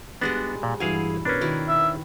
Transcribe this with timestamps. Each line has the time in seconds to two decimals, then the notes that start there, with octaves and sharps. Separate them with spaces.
0.21 G3 G#3 B3 D4 F#4 F#5
0.63 A#2
0.80 G2 E3 E4 F#4 G#4 F5 G#5
1.25 B2 C#4 D4 A#4 B4
1.41 D#3 E4 F#4
1.68 E5